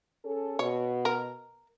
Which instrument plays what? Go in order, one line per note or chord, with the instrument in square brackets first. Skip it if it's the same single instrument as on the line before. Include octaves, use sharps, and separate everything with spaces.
[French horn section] C#4 G#4 A4
[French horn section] B2 [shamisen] C#5
[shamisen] A#4